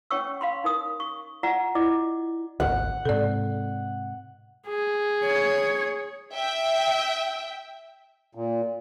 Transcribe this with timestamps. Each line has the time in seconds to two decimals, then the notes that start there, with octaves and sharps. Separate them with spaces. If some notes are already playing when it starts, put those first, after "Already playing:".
0.11 C#4 C#5 G5 C#6 E6
0.41 F5 B5 C6
0.64 D#4 A#4 D#6
1.00 C#6
1.43 F4 D5 F#5 A#5
1.75 E4 F4 D5 D#5 D6
2.60 G#1 D2 F#5
3.05 G#2 C3 A4 D5
4.67 G#4
5.24 C#5
6.33 E5 G5
8.35 A#2